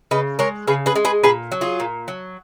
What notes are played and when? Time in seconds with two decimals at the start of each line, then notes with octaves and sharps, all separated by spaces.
0.11 C#3 B4 D#5
0.39 G#3 A#4 C#5
0.67 C#3 G#4 B4
0.86 G#4 B4
0.96 G#3
1.05 G#4 B4
1.23 A#2 G#4 B4
1.52 F#3
1.61 F4 G#4
1.80 A#2
2.08 F#3